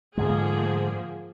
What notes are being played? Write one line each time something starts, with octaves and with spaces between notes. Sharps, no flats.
G#2 D3 F3 G#3 A#3 G#4